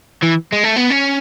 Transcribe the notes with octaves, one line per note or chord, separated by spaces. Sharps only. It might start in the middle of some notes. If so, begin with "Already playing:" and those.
E3
G#3
A3
B3
C#4